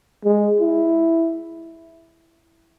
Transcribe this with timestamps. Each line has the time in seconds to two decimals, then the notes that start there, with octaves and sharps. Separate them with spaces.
0.25 G#3
0.60 E4